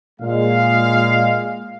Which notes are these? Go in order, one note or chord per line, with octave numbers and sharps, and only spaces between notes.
A#2 G#3 F5